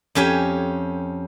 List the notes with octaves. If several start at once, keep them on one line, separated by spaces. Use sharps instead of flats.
F2 C#4 G4 G#5